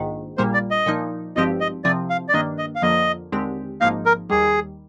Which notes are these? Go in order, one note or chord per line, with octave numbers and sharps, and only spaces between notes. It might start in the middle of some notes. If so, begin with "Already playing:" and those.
Already playing: A#1 G#2 D#3
A#1 A#2 G3 A#3 C5
D5
D#5
A#2 F3 A#3 D#4
G#1 G2 F3 C4 G4 D#5
D#5
C2 C3 F3 C4 D5
F5
D5
G2 D#3 A#3 D4 D#5
D#5
F5
F2 D3 F3 A#3 D#5
D#2 D3 G#3 C4 G4
G#1 G#2 F3 A#3 D#4 F5
A#4
D#2 D#3 G3 G#4